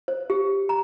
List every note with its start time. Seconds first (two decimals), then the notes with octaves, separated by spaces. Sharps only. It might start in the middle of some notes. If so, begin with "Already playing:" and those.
0.08 C5
0.30 G4
0.69 A#5